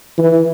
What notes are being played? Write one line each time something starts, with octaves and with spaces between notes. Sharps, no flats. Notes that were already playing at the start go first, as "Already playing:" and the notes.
E3